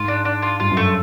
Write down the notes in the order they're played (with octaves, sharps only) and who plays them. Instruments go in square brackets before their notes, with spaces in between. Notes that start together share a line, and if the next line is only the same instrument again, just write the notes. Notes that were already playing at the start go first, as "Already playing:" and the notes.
Already playing: [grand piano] G#2 [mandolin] F4
[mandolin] D4
D4
F4
[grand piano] G2 [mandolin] F4
[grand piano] F#2
[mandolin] A3